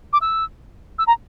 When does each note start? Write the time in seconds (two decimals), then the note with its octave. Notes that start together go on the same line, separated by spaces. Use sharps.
0.13 D6
0.22 E6
0.99 E6
1.07 A#5